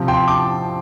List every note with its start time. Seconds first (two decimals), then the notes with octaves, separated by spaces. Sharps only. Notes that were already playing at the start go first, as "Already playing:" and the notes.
Already playing: C3 F3 C4
0.08 G5 C6
0.28 A5 D6